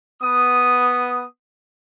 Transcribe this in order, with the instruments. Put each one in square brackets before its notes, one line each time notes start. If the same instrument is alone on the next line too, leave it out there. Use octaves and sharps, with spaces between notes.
[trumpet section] B3 D#6